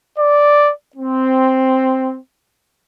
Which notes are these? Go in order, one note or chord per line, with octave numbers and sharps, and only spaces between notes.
D5
C4